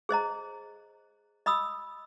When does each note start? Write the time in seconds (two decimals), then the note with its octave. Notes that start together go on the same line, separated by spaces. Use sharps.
0.09 G#4 C5 D#5 A#5
1.46 D#5 B5 D#6 E6